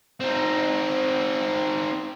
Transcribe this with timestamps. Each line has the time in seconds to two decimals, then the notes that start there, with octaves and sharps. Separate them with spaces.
0.20 C4 D#4